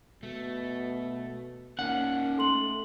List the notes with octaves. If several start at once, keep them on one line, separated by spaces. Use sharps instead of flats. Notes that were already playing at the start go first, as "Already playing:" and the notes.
B2 A3
A#3 C#4 D#4 F#5
A3 A4 C6 F#7